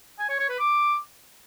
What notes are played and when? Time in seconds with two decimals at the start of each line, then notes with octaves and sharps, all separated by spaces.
0.19 G#5
0.29 C#5
0.39 C#5
0.49 B4
0.59 D6